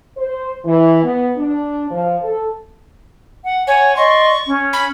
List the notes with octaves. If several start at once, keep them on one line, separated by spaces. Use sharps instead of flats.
C5
E3
B3
D4
F3
A4
F#5
C#5 F#5 G#5
D5 D#5 C6 C#6
C#4
B5